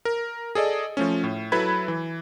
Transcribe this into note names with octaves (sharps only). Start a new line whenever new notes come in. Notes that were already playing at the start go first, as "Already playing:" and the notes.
A#4
G#4 A4 D5 D#5
F3 A3 C#4
A2
F#3 E4 A4 B4 B5 G#6
E3